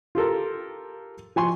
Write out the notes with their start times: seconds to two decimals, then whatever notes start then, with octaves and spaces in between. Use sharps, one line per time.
0.15 F4 G4 A4 A#4
1.36 F3 G#5 C6 C#6